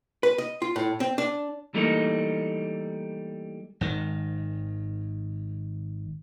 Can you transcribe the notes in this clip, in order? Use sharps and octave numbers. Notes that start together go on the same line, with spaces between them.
B4
D#5
F4
A2
C4
D4
E3 G3 A3 A#3 D#4
G#1 D#3